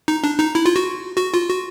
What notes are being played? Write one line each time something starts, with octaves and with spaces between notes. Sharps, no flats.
D#4
D4
D#4
E4
F4
F#4
F#4
F4
F#4